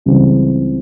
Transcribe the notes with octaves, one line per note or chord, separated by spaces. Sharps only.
C#2 C#3 E3 G3 C4